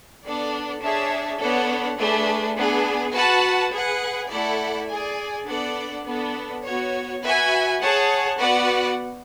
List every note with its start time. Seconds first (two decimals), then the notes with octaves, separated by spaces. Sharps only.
0.23 B3 D4 A4 D5
0.81 D4 G#4 C#5 E5 A5
1.39 B3 D4 A4 C#5 F#5
1.97 A3 D4 G#4 B4
2.56 B3 D4 G#4
3.14 F#4 B4 F#5 A5
3.72 G#4 B4 F#5
4.30 A3 E4 A4 D5 F#5
4.88 G#4 D5 G#5
5.47 B3 D4 A4 D5 F#5
6.05 B3 D4 A4
6.64 B3 F#4 C#5
7.22 F#4 B4 E5 G#5
7.80 G#4 C#5 F#5 A5
8.38 B3 F#4 B4 D5 F#5